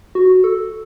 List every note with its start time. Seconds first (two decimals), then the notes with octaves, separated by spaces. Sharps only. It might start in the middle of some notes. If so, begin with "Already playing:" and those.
0.15 F#4
0.44 A4